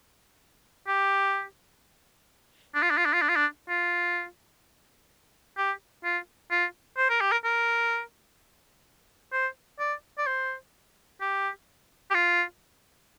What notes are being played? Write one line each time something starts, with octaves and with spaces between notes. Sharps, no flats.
G4
D4
F4
D4
F4
D4
F4
D4
F4
D4
F4
G4
F4
F4
C5
A#4
G4
A#4
A#4
C5
D5
D5
C5
G4
G4
F4